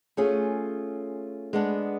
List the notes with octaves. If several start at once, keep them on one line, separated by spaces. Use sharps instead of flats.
A3 C#4 F4 G#4
G#3 B3 D4